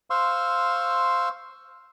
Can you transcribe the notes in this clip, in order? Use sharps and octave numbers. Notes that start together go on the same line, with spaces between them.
C5 F5 C6 C#6 E6